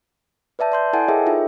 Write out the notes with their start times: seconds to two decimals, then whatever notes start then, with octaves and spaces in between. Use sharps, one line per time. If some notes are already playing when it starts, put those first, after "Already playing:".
0.59 B4 D5 E5 A5 G6
0.72 D5 C6 G6
0.93 E4 A4 F#5 G#5 A5
1.08 G#4 A#4 C#5 D#5 E5 G5
1.26 D#4 F4 A4 E5